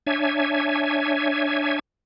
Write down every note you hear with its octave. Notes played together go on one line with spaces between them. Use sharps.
D4 C#5 E5 G#5